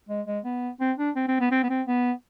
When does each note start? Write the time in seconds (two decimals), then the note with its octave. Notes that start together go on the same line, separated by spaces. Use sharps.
0.09 G#3
0.27 G#3
0.45 B3
0.80 C4
0.98 D4
1.16 C4
1.28 C4
1.40 B3
1.51 C4
1.63 B3
1.70 C4
1.87 B3